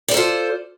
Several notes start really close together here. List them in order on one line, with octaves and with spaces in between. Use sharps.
D5 C5 A4 F4